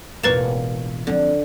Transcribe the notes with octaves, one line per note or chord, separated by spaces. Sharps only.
E1 A1 A#3 F4 B4 C#5 A6 E7
D3 F3 C4